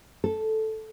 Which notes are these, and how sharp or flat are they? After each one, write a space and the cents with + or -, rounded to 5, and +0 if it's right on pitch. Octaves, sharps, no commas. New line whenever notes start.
A4 -5